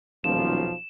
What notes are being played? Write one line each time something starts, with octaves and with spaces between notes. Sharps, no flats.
D#1 B1 F3 E7